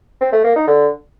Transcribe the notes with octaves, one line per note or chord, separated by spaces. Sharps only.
C4
A3
A#3
D#4
D3